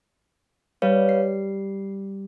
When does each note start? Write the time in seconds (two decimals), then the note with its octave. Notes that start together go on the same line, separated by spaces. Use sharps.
0.82 G3 B4 C#5 F5
1.09 C7